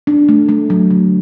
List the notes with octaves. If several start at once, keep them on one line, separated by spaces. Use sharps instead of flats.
D4
A3
A3
F#3
D3